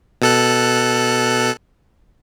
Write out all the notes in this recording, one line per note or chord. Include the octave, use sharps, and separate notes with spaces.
B2 A4 F#6